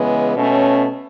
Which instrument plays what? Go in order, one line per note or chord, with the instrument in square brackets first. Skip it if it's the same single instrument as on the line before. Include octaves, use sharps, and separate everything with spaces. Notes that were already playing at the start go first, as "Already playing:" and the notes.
Already playing: [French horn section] C#3 E3 G#3 B3
B2 A3 C#4